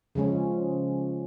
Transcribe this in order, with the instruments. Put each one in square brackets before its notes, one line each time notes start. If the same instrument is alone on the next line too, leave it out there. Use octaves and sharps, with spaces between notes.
[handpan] C#3 F3 G#3 C#4